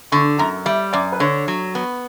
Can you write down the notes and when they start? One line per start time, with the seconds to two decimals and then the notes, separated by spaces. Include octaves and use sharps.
0.12 D3 C#6
0.39 F#2 A#5
0.66 G3 E5
0.93 F#2 D5
1.12 B4
1.20 D3 C#5
1.48 F#3
1.75 B3